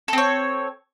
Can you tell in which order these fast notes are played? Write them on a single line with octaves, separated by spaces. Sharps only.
A4 C4 C#5